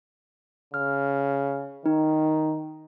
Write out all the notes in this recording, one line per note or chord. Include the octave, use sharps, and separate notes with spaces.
C#3 F6
D#3 D#4